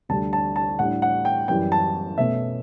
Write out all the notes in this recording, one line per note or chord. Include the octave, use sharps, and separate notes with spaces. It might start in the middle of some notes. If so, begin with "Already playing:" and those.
D2 D3 G3 D4 A5
A5
A5
A2 G3 D4 F#5
F#5
G5
F#2 E3 G3 G5
A5
B2 A3 C#4 E5